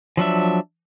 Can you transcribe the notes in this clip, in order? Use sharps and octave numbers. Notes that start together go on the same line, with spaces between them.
F3 F#3 D4 E5